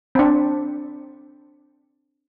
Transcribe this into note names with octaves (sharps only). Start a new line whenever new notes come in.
C4 D4